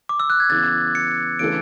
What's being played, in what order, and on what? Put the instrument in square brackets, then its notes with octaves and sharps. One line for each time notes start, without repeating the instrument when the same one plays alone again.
[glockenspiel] D6
E6
F#6
G#6
[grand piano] C#3 E3 B3 [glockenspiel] A6
[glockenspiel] C#7
[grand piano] C#3 E3 A3 D4 A4 [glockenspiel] D7